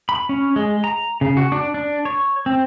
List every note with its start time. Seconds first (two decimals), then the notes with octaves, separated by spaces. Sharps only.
0.09 B5
0.29 C#4
0.56 G#3
0.84 A#5
1.21 C#3
1.37 F#4
1.52 D4
1.74 D4
2.05 C#5
2.46 C4